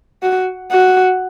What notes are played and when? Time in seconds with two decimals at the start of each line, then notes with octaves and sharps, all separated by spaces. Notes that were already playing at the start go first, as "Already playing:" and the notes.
0.23 F#4
0.71 F#4